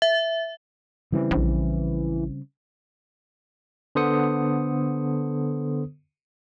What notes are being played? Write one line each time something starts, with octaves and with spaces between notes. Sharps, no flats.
E5
C#3 E3 G3 C4
A#1
D3 B3 A4 C5 D#6 C#7